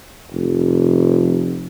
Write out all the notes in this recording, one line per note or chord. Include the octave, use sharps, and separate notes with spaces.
F1